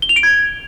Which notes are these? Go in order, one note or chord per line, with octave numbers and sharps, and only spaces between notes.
G7
F7
D7
G#6